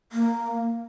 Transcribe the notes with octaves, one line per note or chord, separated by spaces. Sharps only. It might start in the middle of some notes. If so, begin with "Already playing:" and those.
A#3